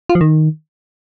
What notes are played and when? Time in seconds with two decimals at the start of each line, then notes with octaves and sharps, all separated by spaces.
0.10 F4
0.15 F3
0.21 D#3